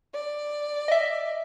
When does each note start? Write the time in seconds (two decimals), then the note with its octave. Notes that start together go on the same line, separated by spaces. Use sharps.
0.14 D5
0.88 D#5 E5